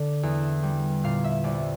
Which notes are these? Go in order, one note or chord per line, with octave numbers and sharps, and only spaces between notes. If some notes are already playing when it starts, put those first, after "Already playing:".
Already playing: D3 D5
E2
G3
A#2 F5
E5
C2 D5